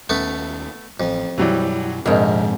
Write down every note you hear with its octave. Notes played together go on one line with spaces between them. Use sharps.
D#2 A3 B3 C#4
A1 F2
F#2 B2 E3 F#3 G3
A#1 F2 G#2 C3 C4 D4 A#4